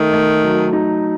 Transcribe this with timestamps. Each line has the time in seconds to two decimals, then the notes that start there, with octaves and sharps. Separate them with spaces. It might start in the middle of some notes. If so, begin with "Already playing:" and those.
Already playing: D#3 A3
0.13 A3
0.43 F#3
0.73 D#4